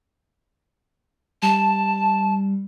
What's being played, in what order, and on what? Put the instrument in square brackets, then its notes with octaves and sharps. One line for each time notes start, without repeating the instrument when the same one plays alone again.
[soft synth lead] G3 [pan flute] A5